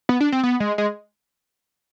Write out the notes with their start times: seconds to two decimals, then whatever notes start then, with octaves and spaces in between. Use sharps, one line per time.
0.09 B3
0.20 D4
0.32 C4
0.43 B3
0.60 G#3
0.78 G#3